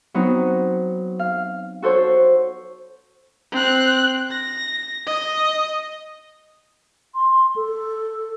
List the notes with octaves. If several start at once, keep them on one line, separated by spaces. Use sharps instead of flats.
F#3 B3 C4 D#4
F5
F#4 A4 C5 C#5
C4 F#6
A#6
D#5
C6
A4